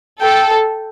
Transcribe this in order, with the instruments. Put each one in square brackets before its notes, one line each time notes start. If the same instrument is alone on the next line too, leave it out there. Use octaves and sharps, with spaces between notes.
[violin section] A4 [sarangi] G5